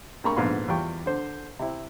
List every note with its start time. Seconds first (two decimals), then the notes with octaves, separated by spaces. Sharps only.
0.24 G2 G#3 A#3 A#5 B5 C#6
0.36 A#1 G#2 D3 B3 F5 C6
0.68 E2 G3 F4 G5 C#6
1.06 D3 C5
1.59 C3 E4